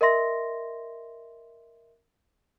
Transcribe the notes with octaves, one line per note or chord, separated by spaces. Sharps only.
A#4 D#5 E5 C6 A#6